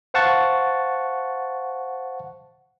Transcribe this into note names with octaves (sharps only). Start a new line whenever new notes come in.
C5 F5 F#5 A5 C#6 A6